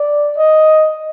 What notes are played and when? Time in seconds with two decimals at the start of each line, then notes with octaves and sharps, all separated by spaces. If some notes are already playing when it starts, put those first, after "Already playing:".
Already playing: D5
0.37 D#5